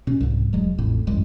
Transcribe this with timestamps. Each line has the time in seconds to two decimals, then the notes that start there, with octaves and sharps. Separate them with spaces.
0.07 B2 C#4
0.21 C2 G#2
0.53 E1 F#3 G#3
0.78 A1 F2 A2
1.07 A1 F#2 G3 G#3